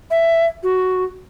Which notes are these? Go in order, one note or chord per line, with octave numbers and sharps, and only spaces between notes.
E5
F#4